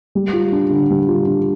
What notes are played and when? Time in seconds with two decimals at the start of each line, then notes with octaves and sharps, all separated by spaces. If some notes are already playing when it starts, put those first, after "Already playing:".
0.15 G3
0.33 F4
0.52 D4
0.70 D3
0.90 G3
1.08 F4
1.27 D4